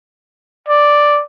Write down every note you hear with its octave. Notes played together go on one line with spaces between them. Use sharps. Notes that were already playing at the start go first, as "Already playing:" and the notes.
D5